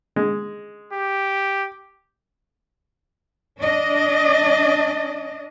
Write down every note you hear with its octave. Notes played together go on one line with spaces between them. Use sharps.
G#3
G4
D4 D#5